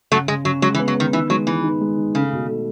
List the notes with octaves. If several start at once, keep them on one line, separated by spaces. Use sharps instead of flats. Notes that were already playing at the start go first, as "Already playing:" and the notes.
C#3 F#3 A3
C#3 G#3
C#3 F#3
F#3 G#3
E3
B3
F#3
D#3 B3
D#3 E3
F#3 G#3
E3 G#3
D#4
G#3
D#3
C#3 A3
B2
A3